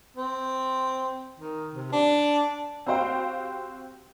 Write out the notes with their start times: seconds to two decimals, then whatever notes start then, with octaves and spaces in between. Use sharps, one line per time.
0.16 C4
1.40 D#3
1.74 C3
1.92 D4
2.86 C4 F#4 G4 C5 F5 G5